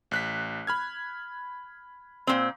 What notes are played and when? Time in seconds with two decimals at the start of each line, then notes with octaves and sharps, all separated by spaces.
0.11 A1 F#6 B6
0.67 B5 F6 G#6
2.27 A#2 C4